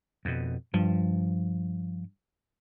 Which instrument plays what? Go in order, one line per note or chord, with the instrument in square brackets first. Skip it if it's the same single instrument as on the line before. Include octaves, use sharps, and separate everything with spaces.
[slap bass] F2 B2
[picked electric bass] G2 [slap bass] F3